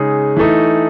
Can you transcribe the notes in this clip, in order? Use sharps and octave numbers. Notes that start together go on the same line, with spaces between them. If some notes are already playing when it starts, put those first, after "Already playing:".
Already playing: C#3 G#3 D#4 G#4
E3 A3 D#4